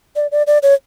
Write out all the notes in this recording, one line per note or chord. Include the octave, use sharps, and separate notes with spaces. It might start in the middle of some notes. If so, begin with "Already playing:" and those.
D5
D5
D5
C#5